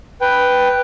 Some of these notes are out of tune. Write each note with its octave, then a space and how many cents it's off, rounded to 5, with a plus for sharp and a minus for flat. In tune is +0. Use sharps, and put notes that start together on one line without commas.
B4 +0 G5 +0